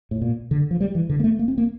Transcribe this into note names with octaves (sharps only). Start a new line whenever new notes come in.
A2
A#2
D3
F3
G3
E3
D3
A#3
A3
A#3
C4
A#3